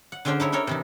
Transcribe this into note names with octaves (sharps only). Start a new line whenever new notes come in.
F#5
D3 G#3 C#4 D4 C5 G5
D#4 E4 C#5
D4 D#4 A4 A#4 C#5
C3 E3 D#4